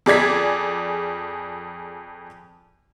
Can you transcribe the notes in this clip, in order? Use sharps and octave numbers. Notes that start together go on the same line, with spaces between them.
F2 G#4 D5 G#6 B6